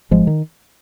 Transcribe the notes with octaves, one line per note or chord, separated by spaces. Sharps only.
G#1 F3 G#3
D#3